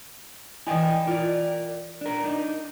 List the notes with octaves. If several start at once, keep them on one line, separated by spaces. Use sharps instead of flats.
E3 E4 D#5 G5 G#5
F4 A#4 D5
D4 A#4
D4 D#4